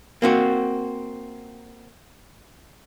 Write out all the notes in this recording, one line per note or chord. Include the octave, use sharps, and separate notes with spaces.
A#3 C4 F#4